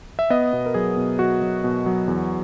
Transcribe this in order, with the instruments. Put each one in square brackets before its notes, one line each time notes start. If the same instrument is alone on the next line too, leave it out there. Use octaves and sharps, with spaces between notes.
[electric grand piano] E5
B3 D#5
B2
A#4
F#3 G#4
B2
F#3 F#4
F#3
B2
F#3
E2